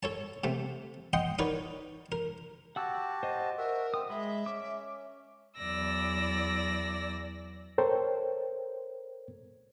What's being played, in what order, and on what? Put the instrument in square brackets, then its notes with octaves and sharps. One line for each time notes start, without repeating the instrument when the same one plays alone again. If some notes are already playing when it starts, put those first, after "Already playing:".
[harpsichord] A4 C#5 A5
C3 A3
D#5 F#5 G5 C6
D#4 A#4 B4 C#5 D5
A#4
[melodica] F#4 G4 A5 [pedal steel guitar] F#5 E6
[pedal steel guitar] C5 D#5
[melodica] F#4 E5 [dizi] A#4
[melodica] C4 [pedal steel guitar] D#6
[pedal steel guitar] G#3 [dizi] E5 [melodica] B5
[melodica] C#4 [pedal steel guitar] D6
[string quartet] E2 F#3 D5 E6 A#6
[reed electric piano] A4 A#4 C5 C#5 G5